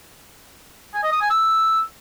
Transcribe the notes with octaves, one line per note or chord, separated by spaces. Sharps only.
G#5
D#5
D#6
G#5
E6